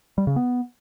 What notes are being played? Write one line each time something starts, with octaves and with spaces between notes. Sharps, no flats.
G3
C#3
B3